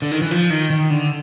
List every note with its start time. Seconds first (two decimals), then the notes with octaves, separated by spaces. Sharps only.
0.02 D3
0.11 D#3
0.21 E3
0.31 F3
0.50 D#3
0.70 D#3
0.90 D3